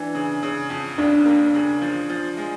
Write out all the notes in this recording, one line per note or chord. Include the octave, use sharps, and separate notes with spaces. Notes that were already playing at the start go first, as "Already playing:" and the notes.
Already playing: E3 D4
C#3
C#3
F2
D#2 D4
A#3
C#3
F3
F3
G#3